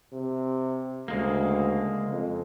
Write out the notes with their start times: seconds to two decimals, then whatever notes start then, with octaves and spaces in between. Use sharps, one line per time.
0.13 C3
1.08 D2 C#3 G#3 A#3
2.10 F2